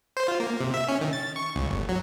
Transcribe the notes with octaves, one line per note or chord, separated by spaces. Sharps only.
C5
F4
A#3
C3
E5
C#4
D#3
A6
C#6
C#2
G1
F#3